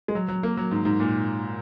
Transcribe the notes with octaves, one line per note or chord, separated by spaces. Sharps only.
G#3
F#3
F#3
A#3
F#3
G#2
G#2
A#2